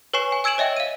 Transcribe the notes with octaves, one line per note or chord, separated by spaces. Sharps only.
B4 C#5 G#5 C#6 C7 E7
G#5
G#5 E6 G#6 D7 E7 F#7
C#5 D#5 E5 G5
F5 D#7